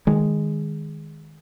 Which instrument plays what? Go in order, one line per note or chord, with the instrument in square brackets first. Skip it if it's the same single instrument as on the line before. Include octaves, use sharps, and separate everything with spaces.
[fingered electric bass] D#3 G#3